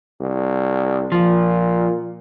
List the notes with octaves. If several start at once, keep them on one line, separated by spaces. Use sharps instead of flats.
C2
A#2 F3